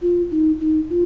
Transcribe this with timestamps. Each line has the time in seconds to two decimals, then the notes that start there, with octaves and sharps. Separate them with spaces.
0.02 F4
0.31 D#4
0.60 D#4
0.90 F4